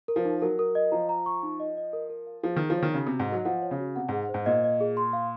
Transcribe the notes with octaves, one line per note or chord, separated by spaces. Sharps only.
A#4
F3
D#4
F#3 A#4
A#4
D#5
F3 A#5
A#5
C#6
D#4
D#5
D#5
A#4
A#4
F5
F3 G#4
D#3 G#4
F3
C#5
D#3
C#3 F#4
C3 F#4
G#2
F#3 D#5
F3 F#5
C#5
C#3
F#4
C3 F#5
G#2 G#4
C5
G#2
A#2 D#5
D#5
G#4
C6
F5